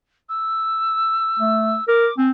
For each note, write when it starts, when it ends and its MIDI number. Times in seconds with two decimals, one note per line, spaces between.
0.29 1.84 88
1.39 1.75 57
1.88 2.08 70
1.88 2.16 86
2.18 2.31 60
2.18 2.26 80